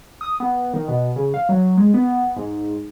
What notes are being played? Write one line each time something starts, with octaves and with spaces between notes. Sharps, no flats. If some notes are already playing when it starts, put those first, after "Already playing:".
D#6
B3
D#3
B2
C#3
F5
F#3
G#3
B3
G#2